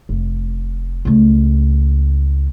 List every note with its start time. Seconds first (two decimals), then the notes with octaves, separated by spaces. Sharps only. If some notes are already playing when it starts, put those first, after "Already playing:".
0.09 F1
1.05 C#2 A3